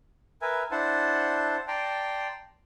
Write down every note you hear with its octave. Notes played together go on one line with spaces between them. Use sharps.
A#4 B4 E5 G#5
D4 E4 C5 F#5 A5
D5 G5 A5 A#5 C6